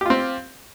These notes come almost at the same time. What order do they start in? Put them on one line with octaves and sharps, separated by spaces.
G4 F4 C4